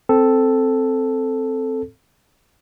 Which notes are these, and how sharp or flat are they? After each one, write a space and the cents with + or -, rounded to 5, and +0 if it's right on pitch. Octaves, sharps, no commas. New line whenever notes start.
C4 +0 A4 +0